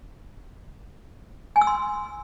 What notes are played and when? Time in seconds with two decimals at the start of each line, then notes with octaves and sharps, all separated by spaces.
1.56 G#5
1.61 E6
1.67 C6